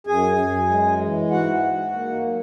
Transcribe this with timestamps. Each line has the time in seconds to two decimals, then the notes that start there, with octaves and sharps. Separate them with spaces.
0.07 F#2 G#4 G#5
0.38 F#2
0.69 G#3
1.00 E3
1.31 G#2 F#4 F#5
1.62 G#2
1.93 A#3
2.24 F#3